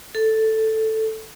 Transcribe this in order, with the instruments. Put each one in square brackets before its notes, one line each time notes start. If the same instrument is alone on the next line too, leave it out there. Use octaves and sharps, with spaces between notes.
[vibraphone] A4